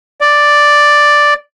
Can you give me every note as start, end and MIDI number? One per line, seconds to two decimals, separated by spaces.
0.21 1.34 74